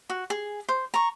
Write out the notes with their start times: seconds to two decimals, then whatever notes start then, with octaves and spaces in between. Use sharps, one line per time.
0.10 F#4
0.30 G#4
0.69 C5
0.94 A#5 C#6